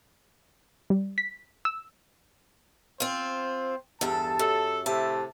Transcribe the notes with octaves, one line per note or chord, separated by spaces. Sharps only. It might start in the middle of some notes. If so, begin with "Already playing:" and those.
G3
B6
E6
C4 F4 C5
E2 G2 A4 A5
F#2 A4
A2 C3 E5 A5